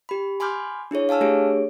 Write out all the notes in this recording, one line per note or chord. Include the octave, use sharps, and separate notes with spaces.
G4 B5
G#5 B5 C6 D6 F6 G6
D4 E4 G#4 C#5
F5 G#5 A5 E6 F6
A3 D4 G4 G#4 C#5 D7